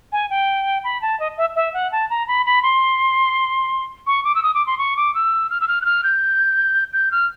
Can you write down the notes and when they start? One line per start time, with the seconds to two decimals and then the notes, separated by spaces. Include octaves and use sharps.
0.12 G#5
0.30 G5
0.84 B5
1.02 A5
1.20 D#5
1.37 E5
1.56 E5
1.74 F#5
1.92 A5
2.10 A#5
2.28 B5
2.46 B5
2.63 C6
4.07 C#6
4.24 D6
4.35 E6
4.43 D#6
4.54 D6
4.67 C6
4.78 C#6
4.97 D6
5.15 E6
5.50 F6
5.61 E6
5.68 F6
5.82 F#6
5.85 F6
6.03 G6
6.93 G6
7.11 F6